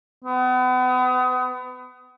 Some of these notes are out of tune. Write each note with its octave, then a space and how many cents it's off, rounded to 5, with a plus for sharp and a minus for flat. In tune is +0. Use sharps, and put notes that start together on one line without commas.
B3 +35